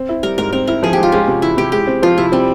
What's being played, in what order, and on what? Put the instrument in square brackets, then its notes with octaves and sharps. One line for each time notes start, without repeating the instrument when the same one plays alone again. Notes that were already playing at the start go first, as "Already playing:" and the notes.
Already playing: [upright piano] C4
E4
[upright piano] G3 [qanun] A#4
[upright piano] G#2 [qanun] A#4
[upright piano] C4 [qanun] A#4
[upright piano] E4 [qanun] A#4
[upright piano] F3 [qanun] G#4
[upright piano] G#2 [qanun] G4
[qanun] F4
[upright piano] G#3 [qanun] C#4
[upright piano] C3
[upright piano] E3 [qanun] E4
[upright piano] C3 [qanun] G4
[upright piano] G#3 [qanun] G4
[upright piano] C4
[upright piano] F3 [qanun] F4
[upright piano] C3 [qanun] E4
[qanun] G3 [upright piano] C4